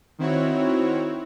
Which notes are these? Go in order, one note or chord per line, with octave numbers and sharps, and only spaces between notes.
D#3 C4 E4 F#4 C#5